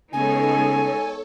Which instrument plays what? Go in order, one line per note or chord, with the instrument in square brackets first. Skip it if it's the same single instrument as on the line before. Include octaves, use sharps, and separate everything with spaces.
[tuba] C#3 [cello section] G#3 B3 D#4 [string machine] A4 C#5 [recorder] G#5